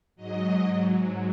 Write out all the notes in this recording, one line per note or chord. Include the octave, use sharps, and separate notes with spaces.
G#2 F#3 D#5
G#2 F#3